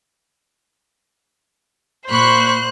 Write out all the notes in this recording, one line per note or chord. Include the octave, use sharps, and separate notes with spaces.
A#2 C5 B5 C#6 F#6